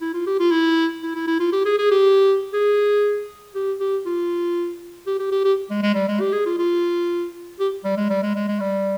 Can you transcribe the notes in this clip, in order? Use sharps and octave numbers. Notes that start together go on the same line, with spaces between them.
E4
F4
G4
F4
E4
E4
E4
E4
F4
G4
G#4
G#4
G4
G#4
G4
G4
F4
G4
G4
G4
G4
G#3
G#3
G3
G#3
G4
G#4
F4
F4
G4
G3
G#3
G3
G#3
G#3
G#3
G3